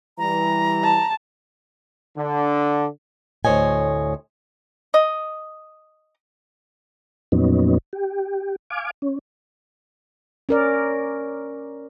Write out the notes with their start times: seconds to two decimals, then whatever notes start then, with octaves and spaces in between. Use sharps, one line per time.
0.18 E3 G3 A#5
0.83 A5
2.17 D3
3.45 D2 A2 C5 C#5 D#5 G#5
4.94 D#5
7.32 F2 A#2 F#3 B3 C#4 D#4
7.93 G4
8.70 F5 G#5 D6
9.02 C#4
10.49 C#4 A#4 D5